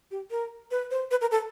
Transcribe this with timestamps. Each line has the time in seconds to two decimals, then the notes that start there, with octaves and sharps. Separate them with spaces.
0.11 G4
0.31 A#4
0.71 B4
0.91 C5
1.11 B4
1.21 A#4
1.31 A4